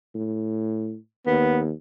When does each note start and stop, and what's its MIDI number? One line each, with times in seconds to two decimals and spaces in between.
0.15 0.96 45
1.26 1.72 39
1.26 1.60 59